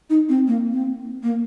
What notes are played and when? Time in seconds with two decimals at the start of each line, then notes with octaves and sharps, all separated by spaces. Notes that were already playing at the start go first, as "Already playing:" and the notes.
0.10 D#4
0.29 C4
0.47 A#3
0.72 C4
1.23 A#3